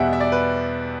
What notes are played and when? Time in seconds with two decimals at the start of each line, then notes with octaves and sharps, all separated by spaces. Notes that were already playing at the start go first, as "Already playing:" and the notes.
Already playing: E2 B2 G3 E5 F#5
0.13 E5
0.20 D5
0.32 B4